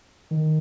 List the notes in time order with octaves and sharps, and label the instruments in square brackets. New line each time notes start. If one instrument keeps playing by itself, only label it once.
[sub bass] D#3